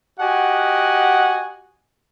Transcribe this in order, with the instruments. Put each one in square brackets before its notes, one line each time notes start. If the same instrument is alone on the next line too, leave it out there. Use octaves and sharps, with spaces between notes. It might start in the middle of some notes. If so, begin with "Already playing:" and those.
[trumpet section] F#4 G4 D#5 F#5 G#5